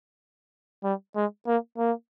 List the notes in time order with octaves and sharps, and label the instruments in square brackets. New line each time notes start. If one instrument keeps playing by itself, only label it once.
[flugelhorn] G3
G#3
A#3
A#3